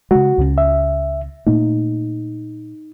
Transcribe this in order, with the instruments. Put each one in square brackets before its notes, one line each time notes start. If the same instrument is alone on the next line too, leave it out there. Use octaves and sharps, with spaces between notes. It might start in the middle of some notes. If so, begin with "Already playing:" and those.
[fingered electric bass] C#3 G#3 [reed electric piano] F#4
[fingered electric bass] C#2 C#3 C#4
[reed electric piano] E5
[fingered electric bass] A#2 A3 A#3 [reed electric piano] D#4